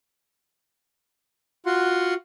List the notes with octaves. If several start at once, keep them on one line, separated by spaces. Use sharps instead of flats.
F4 F#4 F#5 C6